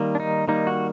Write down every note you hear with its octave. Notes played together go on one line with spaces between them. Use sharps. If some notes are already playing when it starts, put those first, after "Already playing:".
Already playing: D#3 G3 A#3
D4
D#4
D#3 G3 A#3 D#4
F#4